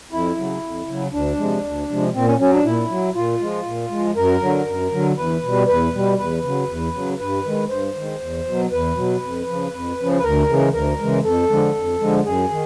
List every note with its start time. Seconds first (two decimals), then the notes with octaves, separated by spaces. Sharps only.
0.12 F2 E4
0.37 C#3 F#3
0.62 F2
0.87 C#3 F#3
1.12 D2 D4
1.37 C3 F3 G#3
1.63 D2
1.89 C3 F3 G#3
2.14 A#2 C4
2.26 C#4
2.39 F#3 C#4
2.52 D4
2.64 A#2 E4
2.89 F#3
3.15 A#2 F4
3.40 F3 G#3
3.65 A#2
3.91 F3 G#3
4.16 F#2 A#4
4.41 D3 F#3
4.67 F#2
4.92 D3 F#3
5.17 E2 B4
5.43 B2 G3
5.68 E2 B4
5.94 B2 G3
6.18 E2 B4
6.43 C#3 F#3
6.69 E2
6.94 C#3 F#3
7.19 G2 B4
7.44 D#3 G#3
7.70 G2 C5
7.95 D#3 G#3
8.20 E2
8.46 B2 F#3
8.72 E2 B4
8.96 B2 F#3
9.22 F2
9.47 C#3 F3
9.73 F2
9.98 C#3 F3
10.18 B4
10.23 D2 A#4
10.48 C#3 E3 G#3
10.73 D2 A#4
11.00 C#3 E3 G#3
11.24 F2 A4
11.50 D3 F3 G#3
11.75 F2
12.00 D3 F3 G#3
12.25 F#2 G#4
12.50 D#3